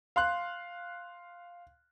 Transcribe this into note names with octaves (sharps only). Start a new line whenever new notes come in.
F5 C6 F#6